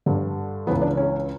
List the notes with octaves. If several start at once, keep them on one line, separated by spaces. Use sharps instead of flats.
G2 D3
C#2 C#3 E3 B3
D4
C#4